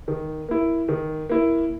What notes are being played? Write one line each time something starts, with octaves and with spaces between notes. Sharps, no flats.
D#3
A#3 E4
D#3
A#3 E4